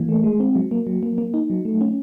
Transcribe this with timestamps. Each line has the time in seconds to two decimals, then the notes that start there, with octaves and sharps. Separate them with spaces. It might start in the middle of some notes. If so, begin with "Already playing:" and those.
Already playing: E3 A#3
0.09 A3
0.24 G#3
0.40 C4
0.55 F#3
0.71 A#3
0.87 F#3
1.03 A#3
1.18 A#3
1.34 D#4
1.50 F#3
1.65 A3
1.81 C#4